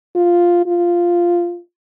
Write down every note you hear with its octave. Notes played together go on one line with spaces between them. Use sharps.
F4
F4